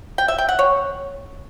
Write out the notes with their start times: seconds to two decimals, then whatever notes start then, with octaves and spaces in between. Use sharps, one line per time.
0.18 G5
0.28 E5
0.38 G5
0.49 F#5
0.59 C#5